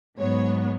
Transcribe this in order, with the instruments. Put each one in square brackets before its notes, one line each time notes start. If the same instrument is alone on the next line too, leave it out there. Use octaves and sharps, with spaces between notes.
[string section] G#2 F#3 B3 C#5